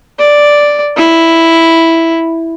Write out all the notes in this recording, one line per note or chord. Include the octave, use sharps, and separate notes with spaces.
D5
E4